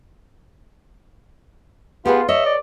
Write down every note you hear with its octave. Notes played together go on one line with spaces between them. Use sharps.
B3 F4 G4 G#4 B4
C#5 D#5 E5
D5